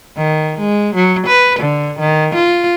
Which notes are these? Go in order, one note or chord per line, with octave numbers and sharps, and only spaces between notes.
D#3
G#3
F#3
B4
D3
D#3
F4